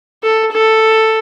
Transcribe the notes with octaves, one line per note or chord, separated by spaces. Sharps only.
A4
A4